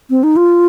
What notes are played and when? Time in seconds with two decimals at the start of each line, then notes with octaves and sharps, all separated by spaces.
0.10 C4
0.23 D#4
0.36 F4